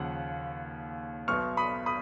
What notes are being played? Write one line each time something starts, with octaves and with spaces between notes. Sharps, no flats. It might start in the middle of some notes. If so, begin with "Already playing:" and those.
Already playing: D#2 C#3 F3 F#5
B1 B2 C#6 F6
B5 D#6
B5 D#6